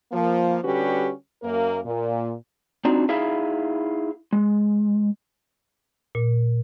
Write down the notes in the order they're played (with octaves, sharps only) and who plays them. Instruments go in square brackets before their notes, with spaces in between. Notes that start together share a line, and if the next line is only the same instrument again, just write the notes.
[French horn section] F3 A#3
D3 G3 C#4 F#4 G4 B4
F#2 A#3 A#4
A#2
[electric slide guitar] C4 D4 D#4 F4 F#4
D#4 E4 G#4 E5 F5
G#3
[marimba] A#2